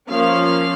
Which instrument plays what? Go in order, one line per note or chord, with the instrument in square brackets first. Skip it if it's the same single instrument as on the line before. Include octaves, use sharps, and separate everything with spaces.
[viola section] F3 A#3 C#4 F5